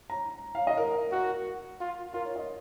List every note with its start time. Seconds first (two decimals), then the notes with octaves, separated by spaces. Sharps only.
0.10 A#5
0.55 F5
0.67 D#5
0.77 A#4
1.12 F#4 A#4
1.80 F4
2.13 F4 A#4
2.25 C#5
2.36 D#5